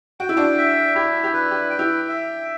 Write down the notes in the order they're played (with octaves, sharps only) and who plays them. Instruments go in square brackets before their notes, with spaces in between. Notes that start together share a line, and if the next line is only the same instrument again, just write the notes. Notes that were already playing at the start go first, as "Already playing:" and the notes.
[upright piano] F#4 [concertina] G5
[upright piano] E4
D4 F#4
[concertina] E5
[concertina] E4 [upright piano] G4
[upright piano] G4
[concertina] B4
[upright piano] G4
[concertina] G5
[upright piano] E4 G4
[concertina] E5